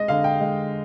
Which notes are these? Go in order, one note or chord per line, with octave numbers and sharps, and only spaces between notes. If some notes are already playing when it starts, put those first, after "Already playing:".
Already playing: G#3 D#5
D3 F5
G5
G#3